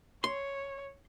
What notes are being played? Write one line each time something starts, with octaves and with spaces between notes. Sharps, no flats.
C#5 C6